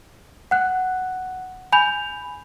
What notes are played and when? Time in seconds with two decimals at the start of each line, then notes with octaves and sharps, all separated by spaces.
0.51 F#5 F#6
1.72 G#5 B5 G6 F7